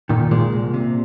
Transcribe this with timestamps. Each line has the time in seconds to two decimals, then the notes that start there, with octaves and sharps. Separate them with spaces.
0.09 A#2 D#3
0.31 A#2 G#3
0.52 C2
0.74 C3